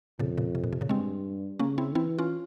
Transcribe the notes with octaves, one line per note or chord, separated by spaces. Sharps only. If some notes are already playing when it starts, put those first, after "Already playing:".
F2 A#2 C#3
A#2 C#3
C3
A#2
C3
A#2 C#3
G2 G#3 C4
C#3 A#3 C#4
C4 E4
E3 C4 E4
C#4 F4